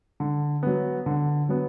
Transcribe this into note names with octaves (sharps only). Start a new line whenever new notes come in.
D3
F#3 B3
D3
F#3 B3